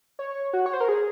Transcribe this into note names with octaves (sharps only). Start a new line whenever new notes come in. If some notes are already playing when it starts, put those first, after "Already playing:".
C#5
F#4
C#5
C5
A#4
G#4